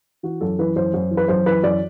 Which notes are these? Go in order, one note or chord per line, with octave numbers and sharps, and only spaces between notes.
E3 F#4
F#2 A4
E3 B4
F#2 C5
F#2
E3
B4
F#2 C5
E3 B4
F#2 D5